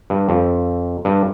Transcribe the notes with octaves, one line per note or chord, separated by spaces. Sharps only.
G2
F2
G2